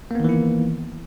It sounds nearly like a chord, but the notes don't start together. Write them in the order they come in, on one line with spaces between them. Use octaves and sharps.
A#3 B3 D#3 E3 E4